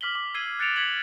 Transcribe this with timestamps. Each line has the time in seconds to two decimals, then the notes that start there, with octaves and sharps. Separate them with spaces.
0.01 D6 F6 B6 F#7 G7
0.15 D6
0.34 E6 G#6 C7 D#7 F#7 G7
0.59 F#6 A6 C#7 D7 E7 F7
0.76 G#6 B6 C#7 F7 F#7